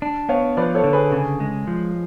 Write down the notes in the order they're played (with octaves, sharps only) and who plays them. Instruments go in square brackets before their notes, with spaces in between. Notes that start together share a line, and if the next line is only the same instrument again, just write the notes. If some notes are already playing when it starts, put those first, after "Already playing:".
[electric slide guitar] D4
[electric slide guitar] B3 [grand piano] C#5 F5
[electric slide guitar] F3 [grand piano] B4 D5
[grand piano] A4 C#5
[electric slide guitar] D3
[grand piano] G#4 B4
[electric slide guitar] C#3 [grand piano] G#4
[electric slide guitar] G#3
F3